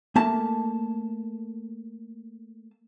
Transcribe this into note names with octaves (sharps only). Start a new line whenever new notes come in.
A3 A#3 A5